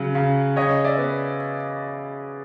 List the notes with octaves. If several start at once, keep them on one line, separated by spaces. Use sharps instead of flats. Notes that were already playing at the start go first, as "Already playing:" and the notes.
Already playing: C#3 F#3
C#3
C#3 C#5 D#5
D5 E5
B3